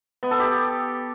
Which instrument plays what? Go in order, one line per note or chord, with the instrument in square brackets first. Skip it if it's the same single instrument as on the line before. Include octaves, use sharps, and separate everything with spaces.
[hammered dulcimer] B3
A4
G4